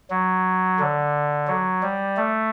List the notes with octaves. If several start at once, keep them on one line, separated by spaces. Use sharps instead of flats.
F#3
D3
F#3
G3
A3